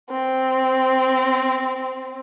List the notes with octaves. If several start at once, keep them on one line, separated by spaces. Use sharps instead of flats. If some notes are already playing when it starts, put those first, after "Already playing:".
C4